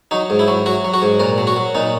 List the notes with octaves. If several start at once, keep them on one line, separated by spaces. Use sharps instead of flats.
F#3 D#4
G#2
E4
F#3
F#3 F#4
F#3
F#4
G#2
A#2 A#4
F#3
F#4
F#3
A#2 D#4